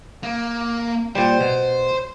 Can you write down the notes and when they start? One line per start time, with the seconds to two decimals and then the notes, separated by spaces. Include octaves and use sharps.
0.23 A#3
1.15 A#2 G3 C5
1.41 B2